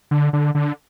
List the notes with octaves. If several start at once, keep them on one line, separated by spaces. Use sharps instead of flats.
D3
D3
D3